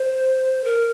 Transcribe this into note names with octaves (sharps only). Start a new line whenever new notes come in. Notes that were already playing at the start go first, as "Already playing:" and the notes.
Already playing: C5
A#4